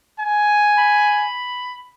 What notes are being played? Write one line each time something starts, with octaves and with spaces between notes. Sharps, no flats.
G#5
B5